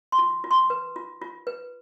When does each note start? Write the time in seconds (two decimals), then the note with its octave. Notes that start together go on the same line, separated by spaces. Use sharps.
0.12 C6
0.19 F4
0.44 F4
0.51 C6
0.70 B4
0.96 F4
1.22 F4
1.47 B4